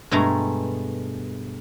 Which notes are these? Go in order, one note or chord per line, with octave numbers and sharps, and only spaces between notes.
G2 B2 G#3 A3 A#5